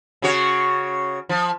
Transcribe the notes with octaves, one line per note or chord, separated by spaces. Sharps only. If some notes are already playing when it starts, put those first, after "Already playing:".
C#3 F#4 C#5
F3